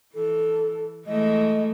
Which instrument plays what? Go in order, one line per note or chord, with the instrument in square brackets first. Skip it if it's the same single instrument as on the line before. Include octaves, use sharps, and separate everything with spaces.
[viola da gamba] E3 [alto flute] A4
[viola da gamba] E3 G#3 A3 [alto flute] D#5